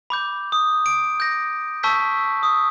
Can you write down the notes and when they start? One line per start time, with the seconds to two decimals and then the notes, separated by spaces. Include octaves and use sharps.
0.10 B5 D6 G6
0.52 D#6
0.86 D7
1.20 G6 A#6
1.83 A5 C#6 E6 G6 B6
2.43 D#6